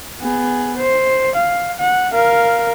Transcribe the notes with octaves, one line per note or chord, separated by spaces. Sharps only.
B3 G#4
C5
F5
F#5
A#4 F5